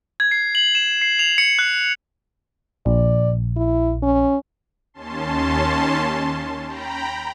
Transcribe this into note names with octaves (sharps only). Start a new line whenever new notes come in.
G#6
C7
F#7
E7
C7
F7
C#7
F#6
A#1 D5
E4
C#4
D#2 C#4 A5 C6
G5 A#5 B5